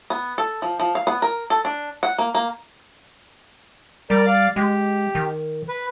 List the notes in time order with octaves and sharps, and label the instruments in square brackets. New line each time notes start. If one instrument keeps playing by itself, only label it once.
[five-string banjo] B3
A4
F3
F3
F5
B3
A#4
A4
D4
F#5
A#3
A#3
[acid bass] G3 [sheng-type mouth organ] A#4 D5
[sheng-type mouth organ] D5 F5
[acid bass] G#3 [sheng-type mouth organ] G4
[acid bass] D#3
[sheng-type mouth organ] B4